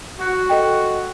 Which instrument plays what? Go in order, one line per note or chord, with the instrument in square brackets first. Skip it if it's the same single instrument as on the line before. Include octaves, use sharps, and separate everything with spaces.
[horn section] F#4
[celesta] A4 D#5 G5